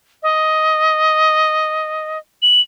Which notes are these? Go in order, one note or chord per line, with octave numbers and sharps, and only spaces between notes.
D#5
F#7